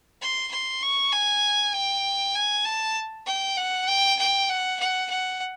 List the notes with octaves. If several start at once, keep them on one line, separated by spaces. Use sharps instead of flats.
C6
C6
C#6
G#5
G5
G#5
A5
G5
F#5
G5
G5
F#5
F#5
F#5